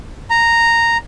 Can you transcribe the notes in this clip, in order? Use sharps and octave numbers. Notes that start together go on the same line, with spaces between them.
A#5